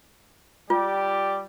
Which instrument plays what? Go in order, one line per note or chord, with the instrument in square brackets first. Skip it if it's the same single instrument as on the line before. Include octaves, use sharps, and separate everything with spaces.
[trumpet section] G3 G4 D5 [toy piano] F4